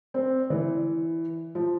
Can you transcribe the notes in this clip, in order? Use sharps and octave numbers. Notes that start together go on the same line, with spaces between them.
C4
E3
F3